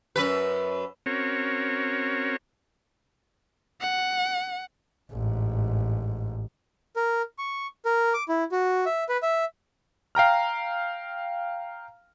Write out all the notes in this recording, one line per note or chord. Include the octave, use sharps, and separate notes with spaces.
F#2 B4
C4 C#4 F#4 A#4 C#5
F#5
A1 G#2
A#4
C#6
A#4
D6
E4
F#4
E5
B4
E5
F5 G5 A#5 F6